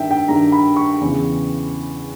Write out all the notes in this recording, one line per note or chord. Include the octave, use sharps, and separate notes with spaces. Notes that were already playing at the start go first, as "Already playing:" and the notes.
Already playing: G2 D#3 E5 G5
G5
G2 D#3 A#5
B5
C#6
E2 C#3 E3